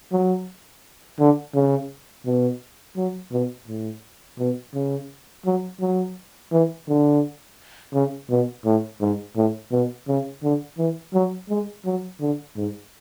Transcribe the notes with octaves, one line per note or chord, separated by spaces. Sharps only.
F#3
D3
C#3
B2
F#3
B2
A2
B2
C#3
F#3
F#3
E3
D3
C#3
B2
A2
G#2
A2
B2
C#3
D3
E3
F#3
G#3
F#3
D3
G#2